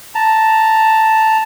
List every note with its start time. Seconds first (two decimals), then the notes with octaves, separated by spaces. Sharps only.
0.15 A5 A#5